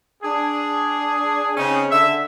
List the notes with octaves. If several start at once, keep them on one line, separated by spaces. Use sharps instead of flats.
D4 G#4
C#3 C4 C#4 D#4 G#4
D3 E5